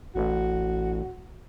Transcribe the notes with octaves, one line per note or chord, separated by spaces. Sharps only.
A1 F#4